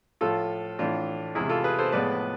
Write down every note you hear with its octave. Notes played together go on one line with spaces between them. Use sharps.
A2 F3 A3 F4 A4
A2 E3 A3 D4 F4
E2 C3 E3 G#3 E4 G#4
F4 A4
G#4 B4
A4 C5
A2 F3 G#3 B3 B4 D5